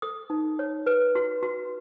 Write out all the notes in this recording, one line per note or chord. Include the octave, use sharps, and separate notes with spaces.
A4 D#6
D#4
C#5
B4
F#4
F#4